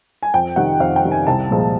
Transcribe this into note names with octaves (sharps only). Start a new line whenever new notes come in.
G#5
F2 G5
C3 D#3 F#5
F2 F5
G5
C3 D#3
G#5
C2 A5
A#2 F3 G#3